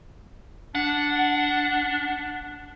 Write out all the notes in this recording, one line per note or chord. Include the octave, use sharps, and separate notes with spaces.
D4 F#5